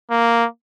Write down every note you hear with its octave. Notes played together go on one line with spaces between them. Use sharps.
A#3